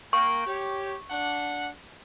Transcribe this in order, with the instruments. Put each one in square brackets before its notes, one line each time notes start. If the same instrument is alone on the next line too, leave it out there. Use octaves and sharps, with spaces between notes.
[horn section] A#3 G5 [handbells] C#6
[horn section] G4 C#5
D4 F#5